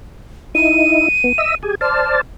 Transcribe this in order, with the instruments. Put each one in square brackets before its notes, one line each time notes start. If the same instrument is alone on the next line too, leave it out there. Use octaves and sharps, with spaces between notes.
[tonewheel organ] D#4 E4 [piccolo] D#7
[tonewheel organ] B3
D#5 E5 E6
G4 G#4 G#5
[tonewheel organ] C5 D5 A5 [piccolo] F6